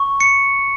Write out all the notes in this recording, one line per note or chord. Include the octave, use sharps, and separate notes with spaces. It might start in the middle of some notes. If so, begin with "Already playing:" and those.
Already playing: C#6
C#7